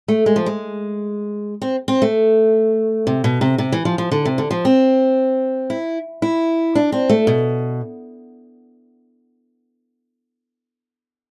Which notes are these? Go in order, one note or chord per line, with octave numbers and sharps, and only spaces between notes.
A3
G#3
F3
G#3
C4
C4
A3
C3
B2
C3
C3
E3
F3
F3
D3
C3
D3
F3
C4
E4
E4
D4
C4
A3
B2